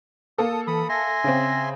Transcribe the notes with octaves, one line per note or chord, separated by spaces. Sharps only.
A#3 A4 D#6
E3 B5 D#6
E5 G#5 C6 A#6
C#3 C4